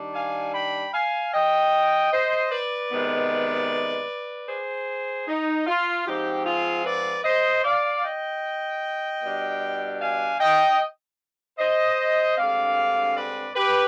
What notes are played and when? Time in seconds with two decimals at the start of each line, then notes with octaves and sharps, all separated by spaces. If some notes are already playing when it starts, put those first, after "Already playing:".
Already playing: D#3 G3 D4
0.15 F5 G#5
0.54 G5 B5
0.94 F5 G#5
1.33 D#5 G5
2.12 C5 D#5
2.51 B4 D5
2.91 C3 D#3 G#3 B3
4.48 G#4 C5
5.28 D#4
5.67 F4
6.07 G#2 F3 C4 D#4 G4
6.46 F4 G#4
6.86 B4 D5
7.24 C5 D#5
7.64 D5 F5
8.04 D#5 G5
9.22 B2 G3 D4
10.01 F5 G#5
10.40 D#5 G5
11.59 C5 D#5
12.37 G2 D3 G#3 C4 D5 F5
13.17 B4 D5
13.56 G4 B4